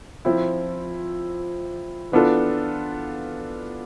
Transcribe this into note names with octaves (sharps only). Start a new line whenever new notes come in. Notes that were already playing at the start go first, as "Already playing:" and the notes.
F3 C4 E4
E3 B3 D4 F4 A4